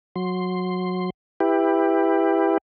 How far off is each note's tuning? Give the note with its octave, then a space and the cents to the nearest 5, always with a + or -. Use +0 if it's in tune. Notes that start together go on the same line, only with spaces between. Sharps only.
F#3 -20 C6 +0
E4 +0 G4 +20 B4 +5